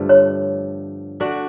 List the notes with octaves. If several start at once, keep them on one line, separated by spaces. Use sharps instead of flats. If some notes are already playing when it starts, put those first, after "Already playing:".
Already playing: G2 D3 F3 A3
C#5
A3 D4 F#4